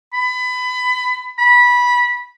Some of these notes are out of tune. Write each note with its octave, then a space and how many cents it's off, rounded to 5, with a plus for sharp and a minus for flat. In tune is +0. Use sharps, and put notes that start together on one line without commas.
B5 +25
B5 -20